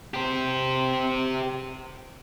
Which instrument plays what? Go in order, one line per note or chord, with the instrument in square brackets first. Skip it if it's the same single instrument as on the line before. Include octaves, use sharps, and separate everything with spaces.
[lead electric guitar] G4 C5